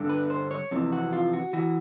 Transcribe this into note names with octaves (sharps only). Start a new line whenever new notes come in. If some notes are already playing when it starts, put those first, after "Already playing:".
Already playing: G2 D3
B4
C5
C#5
F2 C3 E3
F#4
F4
F#4
E3 F#4